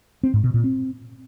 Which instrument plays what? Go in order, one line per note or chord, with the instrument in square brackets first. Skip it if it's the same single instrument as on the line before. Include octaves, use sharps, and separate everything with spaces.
[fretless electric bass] C4
G#2
B2
A#2
C4